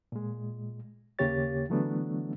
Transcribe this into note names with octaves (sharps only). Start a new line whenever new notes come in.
A#2 G#3
D#2 C#3 A#3 G4 C#5 A6
D3 E3 F#3 A3 B3 D4